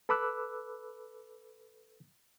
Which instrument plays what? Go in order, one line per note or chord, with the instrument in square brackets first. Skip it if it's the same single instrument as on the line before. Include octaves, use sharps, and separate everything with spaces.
[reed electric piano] A4 B4 B5 D6 E6 F#6